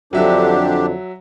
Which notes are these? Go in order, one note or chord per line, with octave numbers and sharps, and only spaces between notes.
F2 D3 F#3 D4 G4 E5